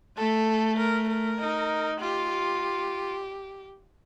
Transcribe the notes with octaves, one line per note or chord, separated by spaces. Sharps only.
A3 A4
A#4
A#4
D#4
F4 G4
G4